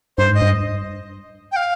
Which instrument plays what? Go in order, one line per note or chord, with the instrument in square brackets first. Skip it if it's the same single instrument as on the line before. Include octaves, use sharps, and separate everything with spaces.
[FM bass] G2 [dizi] C5
[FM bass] G#2
[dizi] D#5
[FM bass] G2
[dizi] G5
F5